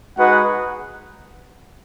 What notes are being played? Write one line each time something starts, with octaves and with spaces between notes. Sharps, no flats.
G#3 D#4 F#4 B4 F#5